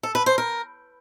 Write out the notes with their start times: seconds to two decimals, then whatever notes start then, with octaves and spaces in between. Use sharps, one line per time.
0.03 A4
0.15 B4
0.26 C5
0.38 A#4